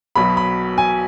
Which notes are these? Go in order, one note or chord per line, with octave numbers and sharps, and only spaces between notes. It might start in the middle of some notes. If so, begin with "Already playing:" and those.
B1 B2 F#3 B5
B5
G#5